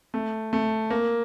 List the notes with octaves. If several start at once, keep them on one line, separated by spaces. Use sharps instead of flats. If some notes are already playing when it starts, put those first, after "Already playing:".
A3
A3
A#3